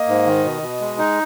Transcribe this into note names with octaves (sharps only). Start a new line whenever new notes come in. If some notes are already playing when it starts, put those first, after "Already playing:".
Already playing: A#3 D#5
G#2
D#3
B2
B2
G#3
D#4